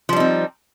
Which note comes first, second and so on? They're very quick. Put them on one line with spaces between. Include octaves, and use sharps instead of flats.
F3 G3 D#4 C4